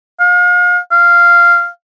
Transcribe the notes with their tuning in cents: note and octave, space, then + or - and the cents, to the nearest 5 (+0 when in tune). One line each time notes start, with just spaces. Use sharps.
F5 +40
F5 -10